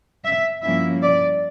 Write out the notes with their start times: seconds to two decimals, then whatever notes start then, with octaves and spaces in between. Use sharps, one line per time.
0.24 E5
0.63 G2 F3 A#3 C#4 E4 E5
1.03 D5